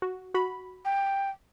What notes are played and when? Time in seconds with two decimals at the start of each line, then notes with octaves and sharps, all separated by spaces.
0.02 F#4
0.34 F#4 B5
0.85 G5